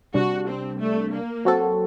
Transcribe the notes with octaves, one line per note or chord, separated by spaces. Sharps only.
C3 G3 D4 F#4
C4
A3
A#3
F#3 C4 F#4 A4